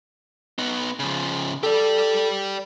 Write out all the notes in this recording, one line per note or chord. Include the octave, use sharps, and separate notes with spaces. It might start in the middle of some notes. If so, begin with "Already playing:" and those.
B3 D#4
C#3 F3
G4 A4 D5